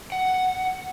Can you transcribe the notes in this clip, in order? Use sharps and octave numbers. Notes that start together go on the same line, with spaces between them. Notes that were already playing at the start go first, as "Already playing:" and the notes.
F#5